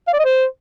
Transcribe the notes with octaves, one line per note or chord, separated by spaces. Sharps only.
F5
D5
D#5
C5